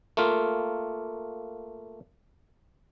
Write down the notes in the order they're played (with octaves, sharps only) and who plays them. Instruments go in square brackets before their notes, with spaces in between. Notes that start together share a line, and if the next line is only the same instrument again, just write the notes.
[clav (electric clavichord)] A3 A#3 F4